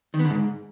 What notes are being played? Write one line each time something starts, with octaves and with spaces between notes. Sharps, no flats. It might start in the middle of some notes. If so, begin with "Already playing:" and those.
D#3
B3
D3
G#2